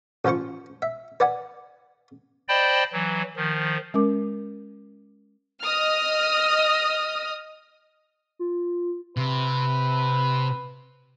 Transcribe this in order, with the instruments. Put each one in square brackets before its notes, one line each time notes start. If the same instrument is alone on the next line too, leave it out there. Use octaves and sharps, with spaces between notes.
[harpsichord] A1 F3 F4 C5 C#6
E5
B4 D5 F#5 G#5
[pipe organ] C5 D5 D#5 G5 A5 B5
E3 F#3
D#3 F3
[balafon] G#3 C#4 A#4 D6
[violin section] D#5 D#6 F6
[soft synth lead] F4
[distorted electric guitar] C3 [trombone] B4